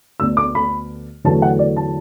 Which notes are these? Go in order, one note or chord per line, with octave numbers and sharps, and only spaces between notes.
D2 D3 B3 D4 E6
D6
B5
E2 D3 F#3 A3 A5
F#5
D5
A5